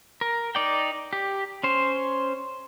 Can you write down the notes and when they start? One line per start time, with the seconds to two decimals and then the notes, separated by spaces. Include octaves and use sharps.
0.21 A#4
0.55 D#4 D5 G5
1.13 G4
1.63 C#4 C5